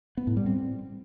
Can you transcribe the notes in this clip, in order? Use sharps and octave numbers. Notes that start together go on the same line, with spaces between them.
B3
A2
G3
C4